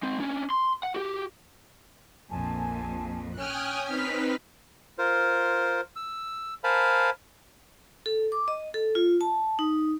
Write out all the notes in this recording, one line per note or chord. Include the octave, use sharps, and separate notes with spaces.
G#3 C4
C#4 D4
C6
F#5
F#4 G4
A#1 F2 A#2 G#5 A5
C#4 G5 G#5 D#6 F6 F#6
C4 D#4 B4 F6 B6
F4 A#4 C5
E6
A#4 C5 F5 G#5 A5 B5
A4
D6
D#5
A4
F4
A5
D#4